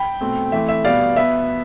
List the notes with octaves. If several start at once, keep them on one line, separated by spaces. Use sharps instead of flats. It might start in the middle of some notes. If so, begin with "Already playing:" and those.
Already playing: G5 B5
B2 A3 C4
E3 A3 C4 E5
E5
B2 G3 B3 D5 F5
B2 B3 E5